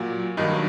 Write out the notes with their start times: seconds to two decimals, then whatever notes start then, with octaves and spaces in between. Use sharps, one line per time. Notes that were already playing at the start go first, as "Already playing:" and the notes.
Already playing: A#2 F#3
0.37 G2 D#3 F#3 D#4